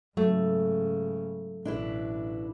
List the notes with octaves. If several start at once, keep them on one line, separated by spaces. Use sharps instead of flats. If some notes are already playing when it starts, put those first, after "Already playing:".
G#2 C#3 F#3 A3
A1 B2 D4 E4 B4